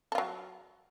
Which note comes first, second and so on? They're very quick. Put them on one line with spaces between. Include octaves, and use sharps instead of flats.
A4 F4 F#3